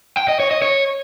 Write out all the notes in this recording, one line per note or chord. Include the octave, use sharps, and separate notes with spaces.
G5
D#5
C#5
D#5
C#5